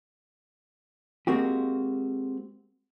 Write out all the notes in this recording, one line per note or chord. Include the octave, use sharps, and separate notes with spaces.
G#3 A#3 C4 F#4 G4